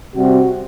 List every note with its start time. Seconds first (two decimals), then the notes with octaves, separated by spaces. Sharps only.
0.16 C3 G3 C4 F#4